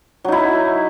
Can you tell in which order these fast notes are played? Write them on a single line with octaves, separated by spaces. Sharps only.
F#3 D#4 E4